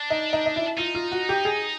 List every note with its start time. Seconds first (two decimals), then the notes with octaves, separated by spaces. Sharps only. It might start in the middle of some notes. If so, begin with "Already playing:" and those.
Already playing: D4
0.10 D#4
0.33 D#4
0.46 D#4
0.56 E4
0.78 D#4 F4
0.95 F4
1.12 F#4
1.29 G4
1.45 G#4